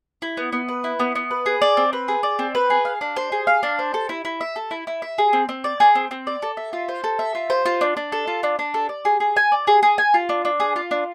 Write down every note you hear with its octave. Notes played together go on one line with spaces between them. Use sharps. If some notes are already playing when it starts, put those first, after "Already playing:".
E4
B3
B3
B4
E4
B3
B3
B4
G#4
D5
C4
B4
G#4
D5
C4
B4
G#4
F5
D4
C5
G#4
F5
D4
C5
A4
E4
E4
E5
A4
E4
E4
E5
G#4
C4
C4
D5
G#4
C4
C4
D5
A4
E5
F4
C5
A4
E5
F4
C5
F4
D4
D4
A4
F4
D4
D4
A4
D5
G#4
G#4
G#5
D5
G#4
G#4
G#5
F4
D4
D4
G#4
F4
D4